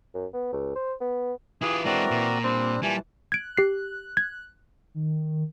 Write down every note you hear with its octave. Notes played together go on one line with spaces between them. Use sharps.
F#2
B3
C#2
C5
B3
E3 E4 F4 G4 G#4
G#3 C4 D4 F#4 A#4 D5
A#2
G3 C4 D4
A#2 E3 G3 G#5 A5
F#6 G#6 D7
G4 C7
G#6
D#3